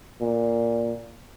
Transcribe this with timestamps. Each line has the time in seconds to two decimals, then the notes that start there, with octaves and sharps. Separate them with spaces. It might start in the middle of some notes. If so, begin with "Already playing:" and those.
0.21 A#2